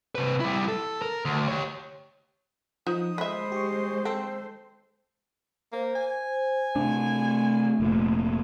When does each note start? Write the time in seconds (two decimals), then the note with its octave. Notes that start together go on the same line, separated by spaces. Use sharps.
0.15 C3 B4
0.40 G3 E4
0.68 A4
1.02 A#4
1.25 D2
1.48 G4 C#5
2.87 F3 D#4 D#6
3.18 G#3 C5 D#5 E5 B5
3.52 G4 C#6
4.05 C4 A4
5.72 A#3 C5
5.95 G#5
6.76 C3 A3 D4
7.80 F1 A#2